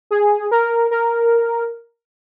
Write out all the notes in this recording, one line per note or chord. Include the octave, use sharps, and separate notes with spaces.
G#4
A#4
A#4